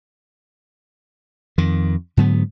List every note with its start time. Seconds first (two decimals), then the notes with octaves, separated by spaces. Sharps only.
1.58 F2 D#3
2.17 G#2 D3 F#3 B3